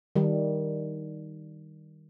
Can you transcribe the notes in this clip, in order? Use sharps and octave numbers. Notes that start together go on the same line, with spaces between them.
D#3 G3